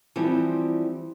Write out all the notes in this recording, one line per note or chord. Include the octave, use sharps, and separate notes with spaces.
E3 F3 G3 C4